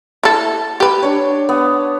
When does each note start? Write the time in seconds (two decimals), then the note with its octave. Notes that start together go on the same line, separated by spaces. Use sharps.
0.23 E4 A4
0.80 G4 B4
1.03 D4 C#5
1.49 B3